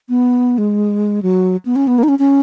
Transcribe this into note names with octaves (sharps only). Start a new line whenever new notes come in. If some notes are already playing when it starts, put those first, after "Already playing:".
B3
G#3
F#3
B3
C#4
B3
A#3
D#4
C#4
C#4